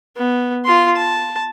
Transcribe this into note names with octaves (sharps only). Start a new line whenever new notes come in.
B3
F4 C6
A5